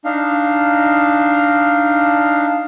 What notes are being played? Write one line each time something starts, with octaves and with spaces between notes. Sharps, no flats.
D4 D#4 F5